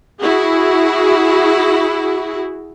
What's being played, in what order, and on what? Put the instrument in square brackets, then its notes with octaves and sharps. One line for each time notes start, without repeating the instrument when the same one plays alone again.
[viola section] E4 F#4 G#4